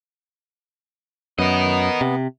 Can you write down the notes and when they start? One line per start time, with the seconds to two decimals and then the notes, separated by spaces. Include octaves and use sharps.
1.39 F#2 B3 A#4 D#5
2.01 C3